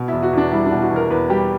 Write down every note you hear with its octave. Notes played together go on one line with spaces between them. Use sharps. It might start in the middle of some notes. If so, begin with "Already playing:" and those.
Already playing: B2
E4
E2
F#4
E2 D4
G3 E4
D4
B2
F#4
E2
A#4
E2 B4
G3 G4